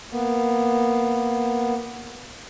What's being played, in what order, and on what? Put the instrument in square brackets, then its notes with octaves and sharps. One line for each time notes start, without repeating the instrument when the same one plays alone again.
[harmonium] A#3 B3